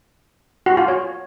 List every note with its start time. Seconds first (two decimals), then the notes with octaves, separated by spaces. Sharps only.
0.66 F#4
0.77 F4
0.88 C#5